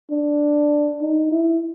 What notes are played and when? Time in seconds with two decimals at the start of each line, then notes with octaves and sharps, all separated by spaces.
0.11 D4
1.01 D#4
1.32 E4